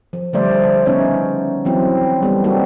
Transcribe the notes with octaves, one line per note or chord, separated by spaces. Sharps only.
F3
D3 F3 G3 A3 C5 D5
C#3 B3 C#4 D#4 C#5 E5
E3 F#3 C4 E4
G3 B3 A4
A#3 C4 D#4 F#4 G4 A4